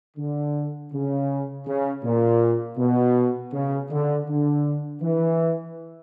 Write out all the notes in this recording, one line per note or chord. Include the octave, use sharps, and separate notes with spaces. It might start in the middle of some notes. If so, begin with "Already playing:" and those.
D3
C#3
C#3
A#2
B2
C#3
D3
D3
E3